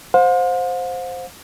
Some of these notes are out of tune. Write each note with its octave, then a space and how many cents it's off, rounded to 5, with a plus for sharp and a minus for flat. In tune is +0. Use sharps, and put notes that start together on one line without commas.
C5 +0 F5 +45